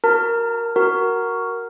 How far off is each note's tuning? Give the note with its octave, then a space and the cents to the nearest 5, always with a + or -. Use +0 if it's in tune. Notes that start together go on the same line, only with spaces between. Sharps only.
F#4 +0 A#4 +0 A5 +40
F#4 +5 A#4 +0